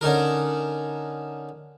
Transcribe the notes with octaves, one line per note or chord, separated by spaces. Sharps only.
D3 C#4 D#4 A#4